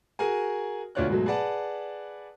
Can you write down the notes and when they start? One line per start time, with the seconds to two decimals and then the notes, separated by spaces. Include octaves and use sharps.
0.19 F#4 G#4 A#4 G#5
0.95 D2 B2 F4 C#5 D5 F#6
1.10 G#2 B2 F#3 A3
1.26 G#4 B4 D5 F#5 A5